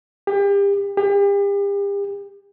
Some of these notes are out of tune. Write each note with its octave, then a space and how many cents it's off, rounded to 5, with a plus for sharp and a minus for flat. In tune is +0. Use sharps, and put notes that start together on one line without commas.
G4 +35
G4 +40